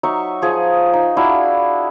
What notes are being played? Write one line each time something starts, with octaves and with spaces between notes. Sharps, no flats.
F#3 D#4 E5 C#6
F3 G#4
D#4
D4 E4 F#4 F5